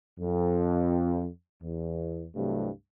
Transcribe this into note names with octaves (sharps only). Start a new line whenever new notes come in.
F2
E2
C2 G2 C3 F#3 A3